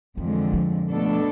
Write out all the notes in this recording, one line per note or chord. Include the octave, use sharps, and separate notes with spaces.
F2 D3 E3 G#3
F3
B2 A3 D4 A4